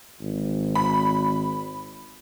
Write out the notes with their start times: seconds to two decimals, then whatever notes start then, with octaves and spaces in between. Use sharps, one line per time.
0.21 G#1
0.75 B5